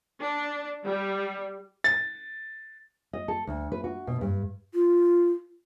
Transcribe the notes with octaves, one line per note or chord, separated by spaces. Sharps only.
D4
G3
A6
D#5
A4
D2
B4
F#4
B2
G2
F4